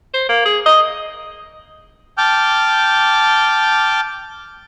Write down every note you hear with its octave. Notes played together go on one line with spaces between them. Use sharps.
C5
A#3
G#4
D#5
G5 A5 D6 F6 G6